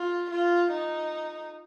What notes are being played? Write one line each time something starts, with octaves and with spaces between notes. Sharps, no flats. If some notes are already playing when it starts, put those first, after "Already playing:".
Already playing: F4
F4
D#4